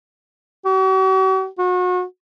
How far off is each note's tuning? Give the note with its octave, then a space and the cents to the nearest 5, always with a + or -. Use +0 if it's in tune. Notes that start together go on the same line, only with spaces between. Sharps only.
F#4 +45
F#4 -35